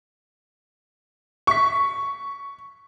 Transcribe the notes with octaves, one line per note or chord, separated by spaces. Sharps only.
C#6 B6